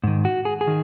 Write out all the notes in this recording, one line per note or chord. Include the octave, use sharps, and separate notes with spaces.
G#2 D#3
F#4
G#4
G#4
D#3